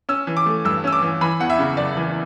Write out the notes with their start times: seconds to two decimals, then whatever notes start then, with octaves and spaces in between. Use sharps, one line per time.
0.09 C#4 E6
0.27 E3
0.37 D6
0.46 A3
0.65 G2 E6
0.84 C#4 E6
0.93 D6
1.02 E3
1.21 E3 B5
1.40 E2 F#5
1.50 E5
1.59 C#3
1.77 F#1 D5
1.97 E3